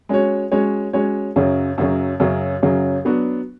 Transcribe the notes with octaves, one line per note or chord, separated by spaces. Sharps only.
G#3 C#4 F#4 C#5
G#3 C#4 F#4 C#5
G#3 C#4 F#4 C#5
F#2 C#3 F#3 C#4
F#2 C#3 F#3 C#4
F#2 C#3 F#3 C#4
F#2 C#3 F#3 C#4
F#3 B3 D4 F#4